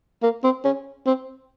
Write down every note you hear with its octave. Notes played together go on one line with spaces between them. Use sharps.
A#3
C4
C#4
C4